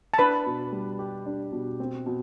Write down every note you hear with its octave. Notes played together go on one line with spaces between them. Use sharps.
A5
D4 B4 B5
B2
G3
G4
D4
B2
C4
B2